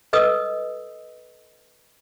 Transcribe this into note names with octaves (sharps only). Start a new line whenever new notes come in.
A4 B4 D#5 D#6 E6